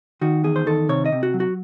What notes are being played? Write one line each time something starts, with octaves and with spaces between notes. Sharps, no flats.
D#3 F#4
E2 G#4
C5
D#3 A4
C3 C#5
D#5
C3
F#4
F#3
F#4